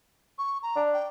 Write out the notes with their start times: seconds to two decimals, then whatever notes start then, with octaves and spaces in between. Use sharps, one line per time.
0.38 C#6
0.63 A#5
0.76 D4
0.94 G5